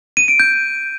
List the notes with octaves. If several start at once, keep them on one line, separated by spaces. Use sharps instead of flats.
D#7
D7
G6